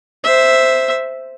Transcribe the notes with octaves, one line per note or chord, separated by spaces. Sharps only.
C5 E5